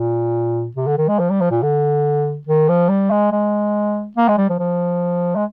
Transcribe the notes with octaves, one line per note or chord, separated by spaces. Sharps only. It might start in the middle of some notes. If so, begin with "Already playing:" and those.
Already playing: A#2
C3
D3
D#3
G#3
F3
G3
F3
A#2
D3
D#3
F3
G3
G#3
G#3
A#3
G#3
G3
F3
F3
G#3